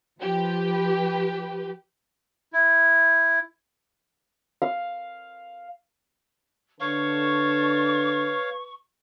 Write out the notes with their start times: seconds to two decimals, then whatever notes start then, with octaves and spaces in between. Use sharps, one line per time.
0.19 F3 G4 B4
2.53 E4
4.62 F5
6.81 D3 B4 C#5 F5 A5 C#6